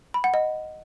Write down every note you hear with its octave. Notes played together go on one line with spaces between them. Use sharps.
B5
F#5
D#5